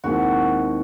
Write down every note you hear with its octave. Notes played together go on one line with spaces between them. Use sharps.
D#2 D#3 G#3 C4 E4 F#4